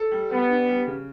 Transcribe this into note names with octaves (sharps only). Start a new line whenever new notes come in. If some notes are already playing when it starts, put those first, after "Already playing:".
Already playing: A4
G3
G3 B3
D4
G3
C#3